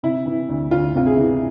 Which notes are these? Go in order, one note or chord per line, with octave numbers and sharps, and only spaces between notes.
C3 E4
E3
D2
D2 F4
C3 F4
G#4
E3